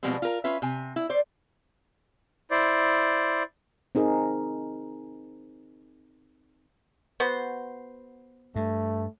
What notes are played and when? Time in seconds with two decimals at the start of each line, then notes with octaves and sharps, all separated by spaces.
0.03 B2 F3 G3 G#3 B3 C4
0.22 F4 A#4
0.44 C#4 F4 B4 E5
0.62 C3 G#5
0.96 E4
1.09 C5 D5
2.51 E4 C5 D5
3.95 C4 D#4 G#4 A#4
7.20 B3 F#4 C5
8.56 G2 A3